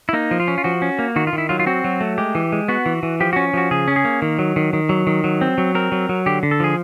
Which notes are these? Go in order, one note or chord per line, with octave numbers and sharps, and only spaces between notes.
E4
A#3 D#4
F3
F4
C#4
F4
F3 F#4
C#4
A#3
D#3 F#4
F4
D#3
E4
F#3 F4
F4
C4 F#4
F#3
A3
G#3 G4
E3
G#3
B3 F#4
E3
E3
F3 G4
C#4 F#4
F3 F#4
C#3 G#4
C#4
G#4
A#3
D#3
F#3
D#3
D#3
F#3
D#3
F#3
C4
F#3
C4 A#4
F#3
F#3
D3 G4
D3
A4
F3 G#4